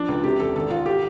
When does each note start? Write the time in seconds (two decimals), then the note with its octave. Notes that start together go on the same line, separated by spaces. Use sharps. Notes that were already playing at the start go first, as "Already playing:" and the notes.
Already playing: F3 D4
0.09 C#2
0.24 C3 G4
0.40 E2 A4
0.56 G#1 A4
0.70 G#1 F4
0.86 G4